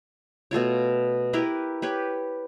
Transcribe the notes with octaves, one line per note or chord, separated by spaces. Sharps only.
B2 A3 F4 C#5
E4 G4 A#4 B4
G4 B4 C#5